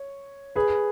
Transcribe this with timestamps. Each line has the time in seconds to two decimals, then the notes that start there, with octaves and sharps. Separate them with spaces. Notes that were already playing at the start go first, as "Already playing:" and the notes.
Already playing: C#5
0.55 G#4 B4